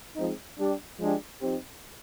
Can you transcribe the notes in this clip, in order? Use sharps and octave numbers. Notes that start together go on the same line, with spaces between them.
F3 G#3 C4 D#4
G3 D4 G4
F3 G#3 D4 G4
F3 C4 D#4 G4